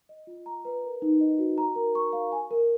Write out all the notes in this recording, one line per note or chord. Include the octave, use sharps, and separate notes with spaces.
D#5
F4
A#5
B4
A#4
D#4
D#5
F#4
A#5
A#4
C#6
F5
G#5
A#4